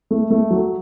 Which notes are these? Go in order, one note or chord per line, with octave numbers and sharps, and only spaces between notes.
A3
A3
F#3